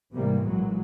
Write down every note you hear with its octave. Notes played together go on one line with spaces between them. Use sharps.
G#2 C3 E3 G3 A#3
B1 A#2 E3 F#3 G#3